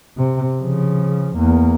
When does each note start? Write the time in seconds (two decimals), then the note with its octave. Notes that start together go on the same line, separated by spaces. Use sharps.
0.17 C3
0.60 C#3 F3
1.37 E2 A#3